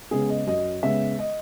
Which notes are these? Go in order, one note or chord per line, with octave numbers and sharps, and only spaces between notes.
C#3 G#3 B3 G#4
D#5
F#2 D#5
C#3 G#3 B3 E5
D#5